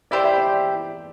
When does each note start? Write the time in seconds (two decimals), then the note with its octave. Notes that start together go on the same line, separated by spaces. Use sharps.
0.11 E4 G4 C5 D5
0.24 E5
0.37 D5